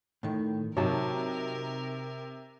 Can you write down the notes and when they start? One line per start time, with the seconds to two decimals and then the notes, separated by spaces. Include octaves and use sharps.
0.23 A2 D#3
0.77 C3 F#3 D#4 A#4 C#5 A5